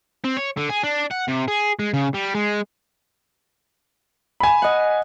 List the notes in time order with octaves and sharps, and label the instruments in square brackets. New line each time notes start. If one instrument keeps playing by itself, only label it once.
[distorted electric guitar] C4
C#5
D3
G#4
D4
F#5
C3
G#4
G#3
C#3
G3
G#3
[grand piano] G#5 B5
[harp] D#5 F#5